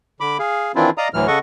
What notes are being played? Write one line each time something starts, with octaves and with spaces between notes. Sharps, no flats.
D3 B5 D6
G#4 F5
D#3 E3 C4 D4 E4 F4
D5 D#5 F5 A#5 D#6
D2 A2 E3 F#3 F6
C#3 A4 D#5 F#5 C#6